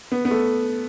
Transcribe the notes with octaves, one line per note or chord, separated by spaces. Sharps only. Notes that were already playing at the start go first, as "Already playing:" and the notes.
B3
B3
A3